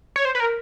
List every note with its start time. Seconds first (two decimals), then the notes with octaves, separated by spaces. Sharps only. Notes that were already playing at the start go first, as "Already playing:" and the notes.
0.16 C#5
0.25 C5
0.35 B4
0.40 A#4